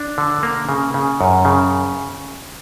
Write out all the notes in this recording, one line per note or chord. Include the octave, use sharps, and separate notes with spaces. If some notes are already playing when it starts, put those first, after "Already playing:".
Already playing: D4
D3
A#3
C#3
C#3
F#2
C#3